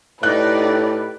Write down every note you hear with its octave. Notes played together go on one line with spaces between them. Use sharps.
A2 D#4 G4 B4 D5 F#6